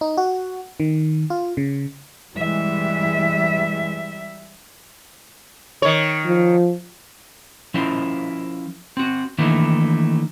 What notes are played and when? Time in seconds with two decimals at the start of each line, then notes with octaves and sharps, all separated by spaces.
0.01 D#4
0.17 F#4
0.80 D#3
1.30 F4
1.57 C#3
2.36 E3 G3 G#3 E5
5.82 D#3 C#5
6.26 F3
7.74 F3 C#4 E4 A#4 C5
8.97 C4 F#4
9.38 D#3 E3 A3 A#3 D4 E4